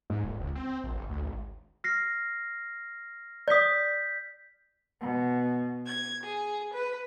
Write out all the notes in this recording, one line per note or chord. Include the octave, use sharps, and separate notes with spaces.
G#2
D#1
C#2
C4
A#1
G1
D2
G#1
F6 A#6 C7
D5 D#6 G6 B6
B2
G#6
G#4
B4